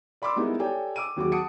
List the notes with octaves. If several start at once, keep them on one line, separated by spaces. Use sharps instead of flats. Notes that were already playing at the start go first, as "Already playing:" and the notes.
D5 B5 C6 D6 E6
G3 G#3 B3 D#4 E4 A#4
G4 A4 C#5 D5 G5 G#5
D6 E6 D7 D#7
D#2 F#3 F#4 G#4 D6
F#5 A5 D#6 C#7 D7